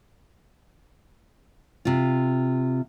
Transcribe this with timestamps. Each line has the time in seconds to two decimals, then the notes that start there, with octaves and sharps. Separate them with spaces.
1.85 C3 F4